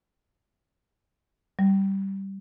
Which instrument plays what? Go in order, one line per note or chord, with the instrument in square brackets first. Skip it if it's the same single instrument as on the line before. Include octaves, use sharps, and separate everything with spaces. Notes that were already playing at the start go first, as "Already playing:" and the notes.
[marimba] G3